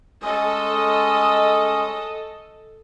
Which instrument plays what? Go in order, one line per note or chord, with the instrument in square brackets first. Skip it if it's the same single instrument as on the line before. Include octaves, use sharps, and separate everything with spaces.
[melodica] G#3 C#4 D#6 [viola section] A4 D#5